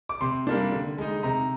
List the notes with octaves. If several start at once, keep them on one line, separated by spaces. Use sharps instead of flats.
D6
C3 C6
G3 A#3 D4
D3
G#3 D#4
C3 A#5